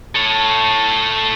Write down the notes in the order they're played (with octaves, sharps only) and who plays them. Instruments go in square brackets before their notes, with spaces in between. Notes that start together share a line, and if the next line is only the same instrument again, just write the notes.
[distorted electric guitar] A4 C#5